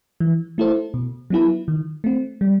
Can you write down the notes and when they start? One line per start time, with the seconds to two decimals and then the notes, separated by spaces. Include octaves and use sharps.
0.20 E3
0.58 A3 E4 A4 C5
0.94 B2
1.30 F#3 B3 E4 B4
1.68 D#3
2.04 A3 C4
2.41 G3